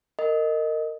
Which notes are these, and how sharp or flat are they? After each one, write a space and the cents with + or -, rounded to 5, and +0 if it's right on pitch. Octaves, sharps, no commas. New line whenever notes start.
A#4 -25 D#5 +0